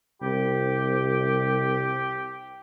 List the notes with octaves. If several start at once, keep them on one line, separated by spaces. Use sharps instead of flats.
C2 G4